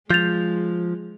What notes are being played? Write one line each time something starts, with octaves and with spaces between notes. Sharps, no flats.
F3 G#3 G6 A6 F7